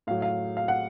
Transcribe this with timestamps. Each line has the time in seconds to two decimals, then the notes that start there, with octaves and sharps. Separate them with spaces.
0.07 A2 F#3 F5
0.22 F5
0.57 F5
0.68 F#5